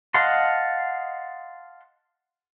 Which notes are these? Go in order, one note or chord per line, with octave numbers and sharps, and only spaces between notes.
D#5 F5 F#5 A5 C6